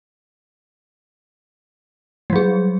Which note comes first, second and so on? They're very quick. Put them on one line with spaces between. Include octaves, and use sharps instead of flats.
G3 F#3 G#4